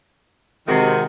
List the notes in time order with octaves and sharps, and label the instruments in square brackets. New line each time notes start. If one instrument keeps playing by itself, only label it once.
[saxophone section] C3 D#3 [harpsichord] G#3 F#4